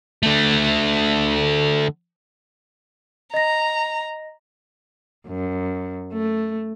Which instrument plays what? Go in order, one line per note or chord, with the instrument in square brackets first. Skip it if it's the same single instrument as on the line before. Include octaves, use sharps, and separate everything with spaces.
[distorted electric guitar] D3 A3
[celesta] D#5 A#6 [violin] A#5
[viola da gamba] F#2
A3